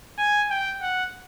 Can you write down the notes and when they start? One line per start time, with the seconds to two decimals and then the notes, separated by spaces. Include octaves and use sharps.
0.19 G#5
0.50 G5
0.82 F#5